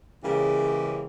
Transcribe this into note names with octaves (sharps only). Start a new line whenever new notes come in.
C#3 E3 G#3 A#3 C#4 G4